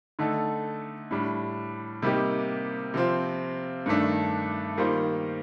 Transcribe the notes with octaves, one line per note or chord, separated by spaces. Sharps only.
D3 A3 D#4 A4
A2 G3 D4
C3 G3 A#3 D#4 G4
C3 F3 C4 F4
G2 D#3 A3 D4
D#3 G3 A#3 F4 C5